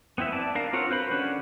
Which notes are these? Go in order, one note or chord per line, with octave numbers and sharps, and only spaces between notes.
B3 C4 E4 E5
D5 A5
D4 A#4 F5
C4 F4 F#4 A#4 C#5
B4 C5 B5
D3 C#4 D4 F#4 C#5